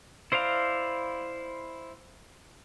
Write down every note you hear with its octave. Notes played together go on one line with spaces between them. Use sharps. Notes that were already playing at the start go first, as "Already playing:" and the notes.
E4 C5 D5 F5 A#5